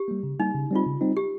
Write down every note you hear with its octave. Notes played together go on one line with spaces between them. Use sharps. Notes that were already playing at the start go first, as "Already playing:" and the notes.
Already playing: G4
G3 A#3
C#3
G3 A#3 D#4
C#3
G3 C4 D#4 F4
C#3
G3 C4 D#4
G4